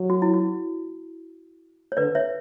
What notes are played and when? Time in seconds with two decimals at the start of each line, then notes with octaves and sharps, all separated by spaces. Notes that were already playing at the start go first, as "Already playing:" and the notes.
Already playing: F#3
0.10 F#4
0.22 E4
0.34 F#4
1.92 C#5
1.97 D3 B4 D5
2.15 C#5 E5